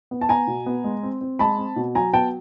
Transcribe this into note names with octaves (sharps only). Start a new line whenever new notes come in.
B3
A5
B3 G#5 A#5
B2
B3
G#3
C4
C4
G#3 A5 B5
C4
B2
F#3 G#5 A#5
B3 G5 A5